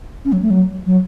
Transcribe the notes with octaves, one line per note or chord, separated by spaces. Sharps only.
C#4
F#3
A3
F#3
F#3